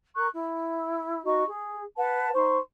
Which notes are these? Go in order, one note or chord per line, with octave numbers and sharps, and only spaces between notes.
A#4 C#6 F#6
E4
D#4 F#4 D#5 C#6
G#4
B4 F#5 A5
D#4 C5 C6 C#6